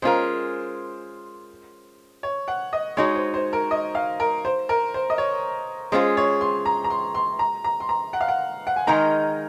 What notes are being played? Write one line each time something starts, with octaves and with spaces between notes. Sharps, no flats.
G#3 C#4 F4 A#4 C5
C#5
F#5
D#5
G#3 D#4 F#4 C#5
C5
C5
A#4
D#5
F5
A#4
C5
A#4
C5
D#5
C#5
G#3 C#4 F4 G#4 C5
C#5
C6
A#5
A#5
C6
C6
A#5
A#5
C6
A#5
F#5
F5
F#5
F#5
G#5
D#3 G#3 D#4 A#4 A#5